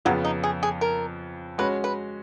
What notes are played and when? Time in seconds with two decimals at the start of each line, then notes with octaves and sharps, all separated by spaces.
0.05 F2 C#3 F3 F#3 B3
0.25 D#4
0.43 G#4
0.63 G#4
0.81 A#4
1.58 G#3 C#4 F#4 B4
1.84 B4